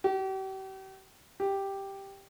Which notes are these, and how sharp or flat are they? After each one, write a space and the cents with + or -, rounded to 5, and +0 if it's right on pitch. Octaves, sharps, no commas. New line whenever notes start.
G4 -40
G4 +0